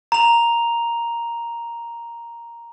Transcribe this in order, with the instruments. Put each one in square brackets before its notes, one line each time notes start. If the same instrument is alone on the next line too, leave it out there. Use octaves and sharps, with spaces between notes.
[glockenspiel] A#5 F7